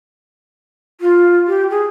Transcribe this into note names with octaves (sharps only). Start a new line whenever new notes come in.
F4
G4
G#4